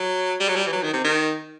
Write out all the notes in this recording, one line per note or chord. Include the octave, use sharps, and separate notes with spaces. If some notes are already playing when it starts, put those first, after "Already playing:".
Already playing: F#3
G3
F#3
G3
E3
F#3
D#3
C3
D#3